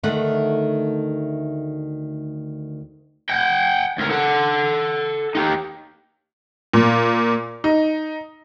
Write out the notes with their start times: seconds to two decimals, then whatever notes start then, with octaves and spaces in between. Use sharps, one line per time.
0.03 D2 D#3 A3 F#5
3.30 F#5 G5
3.99 D2 A#4
4.11 A4 F#5
5.35 D#4 G4
6.74 A#2
7.64 D#4